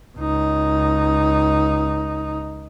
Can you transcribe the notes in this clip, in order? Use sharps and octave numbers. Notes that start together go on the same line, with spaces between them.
C#2 D#4